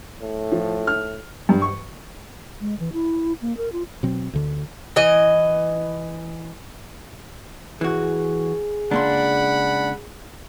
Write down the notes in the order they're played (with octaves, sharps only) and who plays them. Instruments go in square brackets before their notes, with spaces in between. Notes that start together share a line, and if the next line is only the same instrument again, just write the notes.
[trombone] A2
[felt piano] F3
F6
[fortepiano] G2
C#6
[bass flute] G#3
E3
E4
A#3
A#4
F4
[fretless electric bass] B2 F#3 C4
D2 D3
[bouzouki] E3 D#5
[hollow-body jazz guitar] E3 F#4 [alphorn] G#4
[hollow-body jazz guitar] C#2 A#3 C6 [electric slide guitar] D4 [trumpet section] F#5 B5